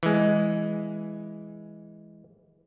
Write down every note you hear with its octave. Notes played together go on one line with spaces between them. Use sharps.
E3 G#3